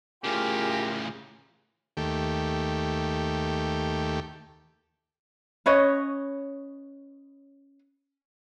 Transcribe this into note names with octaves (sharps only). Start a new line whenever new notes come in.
A2 C#3 F4 G4 G#4 A#4
D#2 A3 G4
C#4 B4 C#5 D#5